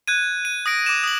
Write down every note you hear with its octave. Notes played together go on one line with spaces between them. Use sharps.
F#6 G#6 D#7
D#7
D#6 A#6 D7
D6 D#7 E7
D#6 F#7